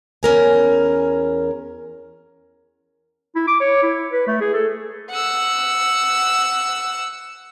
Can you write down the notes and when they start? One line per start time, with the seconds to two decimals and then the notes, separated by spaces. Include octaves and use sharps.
0.23 E2 C#4 A#4 G#5
3.35 E4
3.48 D6
3.60 C#5
3.83 E4
4.12 B4
4.27 A3
4.41 G#4
4.54 A4
5.10 F#5 E6